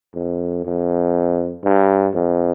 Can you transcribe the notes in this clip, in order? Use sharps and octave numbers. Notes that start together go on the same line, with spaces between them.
F2
F2
G2
F2